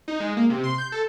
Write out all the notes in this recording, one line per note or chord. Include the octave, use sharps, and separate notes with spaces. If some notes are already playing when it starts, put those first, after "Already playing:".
D#4
G#3
A#3
C3
C6
G6
A4